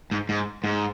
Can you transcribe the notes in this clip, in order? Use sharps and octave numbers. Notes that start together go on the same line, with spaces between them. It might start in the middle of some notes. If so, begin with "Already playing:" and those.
G#2
G#2
G#2